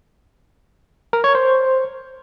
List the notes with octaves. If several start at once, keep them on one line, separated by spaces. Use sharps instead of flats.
A#4
C#5
C5